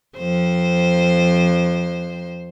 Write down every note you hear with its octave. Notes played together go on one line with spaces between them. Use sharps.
F2 C5